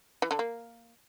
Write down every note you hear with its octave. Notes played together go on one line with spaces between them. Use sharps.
E3
D3
A#3